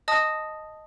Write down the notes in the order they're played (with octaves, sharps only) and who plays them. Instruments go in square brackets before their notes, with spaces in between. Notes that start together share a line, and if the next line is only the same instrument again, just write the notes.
[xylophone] D#5 A5 D#6